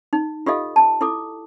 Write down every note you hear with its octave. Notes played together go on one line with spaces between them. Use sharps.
D#4
F4 G4 A4 D#5 F5
A5
E4 A4 D6